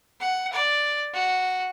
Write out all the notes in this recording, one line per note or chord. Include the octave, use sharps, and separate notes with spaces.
F#5
D5
F#4